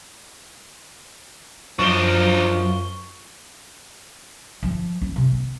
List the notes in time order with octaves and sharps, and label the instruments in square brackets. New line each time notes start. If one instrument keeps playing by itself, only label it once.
[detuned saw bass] F#2 [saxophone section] F3 [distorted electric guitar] D4 D#4 [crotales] C#6 G7
[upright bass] F3
C#4
C3
B3